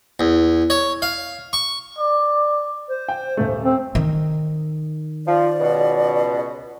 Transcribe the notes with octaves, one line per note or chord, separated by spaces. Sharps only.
E2
C#5
F5
C#6
D5
C5
G5
D#1 A3
C4
D#3
F3 D5
C#2 B2